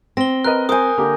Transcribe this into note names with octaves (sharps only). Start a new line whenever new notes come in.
C4 A#6 G7
A#4 B4 D#5 F#6
A#4 C5 G#5 D#6 G6
D3 A#3 G4